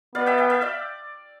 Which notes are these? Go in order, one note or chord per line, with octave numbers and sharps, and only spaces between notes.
B3 D5 F5
E5 G5
E5 G5
E5 G5
D5 F5